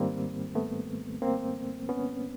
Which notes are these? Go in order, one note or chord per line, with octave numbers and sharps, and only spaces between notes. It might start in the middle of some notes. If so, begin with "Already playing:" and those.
Already playing: G#2 D#3 G3 A#3 C4
A3 B3
A#3 C4
B3 C#4